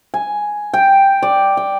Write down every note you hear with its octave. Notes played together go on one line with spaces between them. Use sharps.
G#5
G5
D5
G5